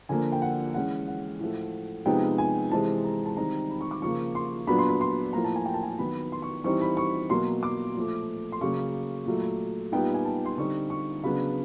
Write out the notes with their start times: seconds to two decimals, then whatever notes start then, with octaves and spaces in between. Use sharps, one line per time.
0.09 D3 F3 A#3 G#5
0.32 G5
0.42 F#5
0.74 E3 G#3 C#4 F#5
1.08 F#5
1.40 A2 F3 A3
2.06 C3 F3 G#3 B3 D#4 G5
2.38 G#5
2.71 C3 E3 G#3 C4 A5
3.04 A#5
3.26 A5
3.37 D#3 G3 C4 D#4 A#5
3.70 B5
3.81 C#6
3.91 D6
4.02 C#3 F3 A#3 C#6
4.35 C6
4.67 A#2 F#3 B3 D4 B5
4.78 C6
4.89 B5
5.01 C6
5.33 A2 F3 A#3 A#5
5.44 A5
5.56 G#5
5.66 G5
5.74 A5
5.83 G#5
5.90 A5
5.98 D#3 F#3 B3 B5
6.32 C6
6.42 C#6
6.64 E3 G3 C4 D#4 C#6
6.82 B5
6.97 C#6
7.30 B2 F#3 A#3 C6
7.63 D6
7.95 A#2 F3 A3
8.52 C6
8.61 C#3 F#3 A#3 C#4 C#6
9.26 A#2 F#3 A3
9.92 A#2 G3 B3 D#4 G5
10.14 G#5
10.25 A5
10.45 C6
10.58 D3 G3 C4 D#4 C#6
10.90 C#6
11.23 C#3 F#3 B3 D4 B5